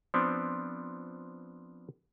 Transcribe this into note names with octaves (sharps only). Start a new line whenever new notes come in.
F3 B3 C4 D4